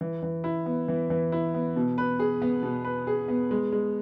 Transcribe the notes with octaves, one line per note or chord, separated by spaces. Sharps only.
E3
E3
E4
B3
E3
E3
E4
B3
B2
B4
G#4
B3
B2
B4
G#4
B3
G#3
G#3